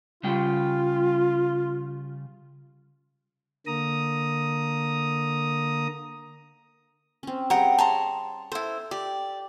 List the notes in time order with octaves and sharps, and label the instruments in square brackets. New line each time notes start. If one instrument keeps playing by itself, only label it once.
[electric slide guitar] C#3 G3 G5 [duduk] F4
[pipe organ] D3 A#3 A#5 D#6
[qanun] C4 C#4
[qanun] G3 G#4 [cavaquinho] F#5 G5 A#5
[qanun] C#5 [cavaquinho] A5 A#5 C6
[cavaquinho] E4 C5 [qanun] A4
[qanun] G4 [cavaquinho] D5